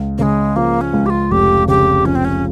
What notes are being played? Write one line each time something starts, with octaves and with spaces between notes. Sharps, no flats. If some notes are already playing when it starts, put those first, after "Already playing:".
Already playing: C#2
C#3 G#3 A#3
F3 A#3
C#4
C#2
G4
F4
F1 G4
C#3 G4
F3 C#4
C4
C#4